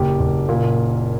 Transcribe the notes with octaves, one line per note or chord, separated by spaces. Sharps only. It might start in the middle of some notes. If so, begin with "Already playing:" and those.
Already playing: F#1 G4
F#1
A#2